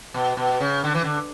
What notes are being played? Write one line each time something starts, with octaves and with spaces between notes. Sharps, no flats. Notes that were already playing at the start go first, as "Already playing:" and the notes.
B2
B2
C#3
D3
E3
D3